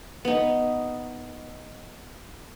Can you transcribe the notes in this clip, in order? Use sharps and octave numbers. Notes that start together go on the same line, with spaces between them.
B3 D#4